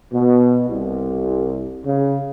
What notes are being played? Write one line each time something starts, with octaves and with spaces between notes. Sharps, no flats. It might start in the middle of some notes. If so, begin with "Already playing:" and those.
B2
C2
C#3